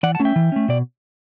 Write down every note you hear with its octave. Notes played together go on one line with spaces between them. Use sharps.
E3 D5 F#5
F#5 A5
A3 C#4
E5 G5
E3
A3 C#4
B2 D5